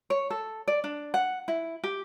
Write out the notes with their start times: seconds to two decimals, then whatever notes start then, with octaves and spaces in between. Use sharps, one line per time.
0.10 C#5
0.30 A4
0.68 D5
0.84 D4
1.14 F#5
1.48 E4
1.84 G4